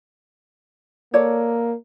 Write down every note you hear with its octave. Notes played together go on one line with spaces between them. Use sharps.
A#3 A4 C#5 D5